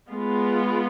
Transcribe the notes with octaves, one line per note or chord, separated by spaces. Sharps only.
G#3 B3 F4